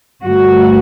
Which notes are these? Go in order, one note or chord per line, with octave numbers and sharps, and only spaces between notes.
G2 D3 A3 F#4